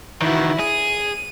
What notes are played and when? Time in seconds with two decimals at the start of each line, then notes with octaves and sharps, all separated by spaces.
0.22 D#3 E3 E4 F#4
0.59 G#4 D#7